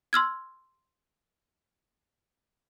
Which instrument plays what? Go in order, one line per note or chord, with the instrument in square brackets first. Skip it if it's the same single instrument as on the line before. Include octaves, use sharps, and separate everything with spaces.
[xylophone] C6 E6 F6 G#6